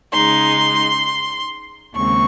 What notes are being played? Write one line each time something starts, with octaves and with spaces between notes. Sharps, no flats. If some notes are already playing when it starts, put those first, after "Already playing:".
C#3 G#3 D#4 C6
D#2 C#3 G#3 C4 C#6